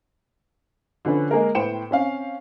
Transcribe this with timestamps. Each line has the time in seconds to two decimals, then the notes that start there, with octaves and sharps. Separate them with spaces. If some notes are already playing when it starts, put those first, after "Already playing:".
1.05 D3 F3 C#4 B4
1.31 G#3 A#3 G#4 A#4
1.55 A2 B3 C5 G5 C#7 E7
1.91 C4 C#4 F5